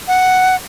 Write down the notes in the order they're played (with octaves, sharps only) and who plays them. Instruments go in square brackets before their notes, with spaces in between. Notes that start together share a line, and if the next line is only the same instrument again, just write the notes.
[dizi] F#5